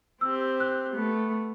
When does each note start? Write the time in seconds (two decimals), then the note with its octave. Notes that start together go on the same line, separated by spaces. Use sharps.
0.21 C4 G4 E6
0.60 F#6
0.93 A3 B3